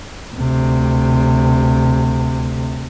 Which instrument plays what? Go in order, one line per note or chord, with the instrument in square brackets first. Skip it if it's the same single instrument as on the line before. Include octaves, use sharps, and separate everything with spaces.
[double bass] D2 C3